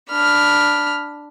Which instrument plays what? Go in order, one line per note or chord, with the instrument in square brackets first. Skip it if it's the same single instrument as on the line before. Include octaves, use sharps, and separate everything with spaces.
[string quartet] D4 B5 F6